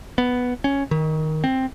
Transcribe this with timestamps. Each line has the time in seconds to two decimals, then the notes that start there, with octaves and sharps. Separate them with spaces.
0.18 B3
0.64 C#4
0.91 D#3
1.44 C4